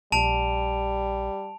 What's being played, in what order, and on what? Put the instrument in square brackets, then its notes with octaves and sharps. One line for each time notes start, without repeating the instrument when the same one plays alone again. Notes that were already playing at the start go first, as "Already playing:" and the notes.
[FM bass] A#1 [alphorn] G3 [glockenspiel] A5 D7 F7